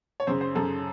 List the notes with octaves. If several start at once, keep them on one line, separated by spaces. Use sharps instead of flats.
C#5
F#2 C#3 C5
C5
F#2 C#3 A4